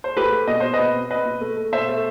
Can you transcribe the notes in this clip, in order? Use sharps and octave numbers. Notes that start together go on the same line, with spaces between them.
C5
A3 G4 B4
A3
B2 D#5
B2 C5
B4 D#5
B2
C4
C4 B4 D#5
B2
A3
A3
B2 C5 E5
A3